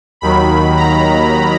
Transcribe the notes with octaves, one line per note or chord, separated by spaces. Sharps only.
D#2 D#3 F#3 B5
A#5